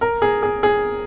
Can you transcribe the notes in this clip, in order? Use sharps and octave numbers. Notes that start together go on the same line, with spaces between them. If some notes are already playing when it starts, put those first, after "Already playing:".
A#4
G#4
G#4
G#4